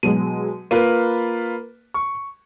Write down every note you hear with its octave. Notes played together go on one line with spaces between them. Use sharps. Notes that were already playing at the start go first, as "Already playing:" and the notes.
B2 F#3 G#3 D#7
A#3 F4 B4 D#7
C#6